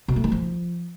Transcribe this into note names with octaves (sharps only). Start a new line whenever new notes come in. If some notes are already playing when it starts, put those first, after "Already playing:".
B2
A3
D#3
F3